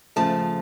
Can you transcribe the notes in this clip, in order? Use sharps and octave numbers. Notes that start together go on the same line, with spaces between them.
F2 C#3 F3 A3 A5